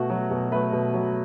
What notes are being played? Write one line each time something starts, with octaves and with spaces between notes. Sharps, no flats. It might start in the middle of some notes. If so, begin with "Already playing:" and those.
Already playing: B2 A3 F#4
F#3
B2
A3 B4
B2
F#3